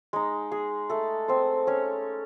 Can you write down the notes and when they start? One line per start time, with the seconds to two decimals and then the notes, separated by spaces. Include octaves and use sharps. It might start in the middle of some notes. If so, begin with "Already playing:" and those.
0.13 G#3 D#4
0.52 G#4
0.90 A3 A4
1.28 C4 C5
1.67 C#4 C#5